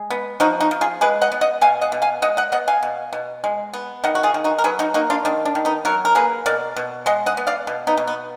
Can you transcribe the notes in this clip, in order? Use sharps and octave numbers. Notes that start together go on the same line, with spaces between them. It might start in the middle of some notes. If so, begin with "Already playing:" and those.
Already playing: G#3
B3
F3 D#4 F#4
D#4 F#4
F3
F4 G#4
G#3 G#4 B4
D#5 F#5
B3
D#5 F#5
B2 F5 G#5
D#5 F#5
B2
F5 G#5
G#3 D#5 F#5
D#5 F#5
B3 D#5 F#5
F5 G#5
B2
B2
G#3
B3
D#3 D#5 F#5
F#4
F4 G#4
D#3
D#4 F#4
A#4
F#3 G#4 B4
D#4 F#4
A#3 D#4 F#4
D4 F4
D#3 D4
D4
D#3
B3 D#4
F#3 F#4 A#4
A#4
A#3 G#4 B4
B2 A#4 D5
B2
G#3 D#5 F#5
D#5 F#5
B3
D5 F5
B2
B3 D#4
B2
B3